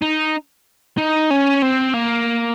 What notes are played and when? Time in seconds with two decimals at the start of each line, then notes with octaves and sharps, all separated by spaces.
0.02 D#4
0.98 D#4
1.31 C#4
1.62 C4
1.94 A#3